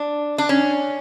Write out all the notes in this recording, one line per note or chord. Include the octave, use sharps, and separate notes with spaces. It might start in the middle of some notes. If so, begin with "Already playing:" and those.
Already playing: D4
D4
C#4